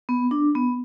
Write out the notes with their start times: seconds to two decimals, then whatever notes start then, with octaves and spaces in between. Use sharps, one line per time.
0.09 B3
0.31 D4
0.55 B3